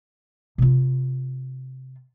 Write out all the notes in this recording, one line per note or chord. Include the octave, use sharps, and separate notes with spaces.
C3 F4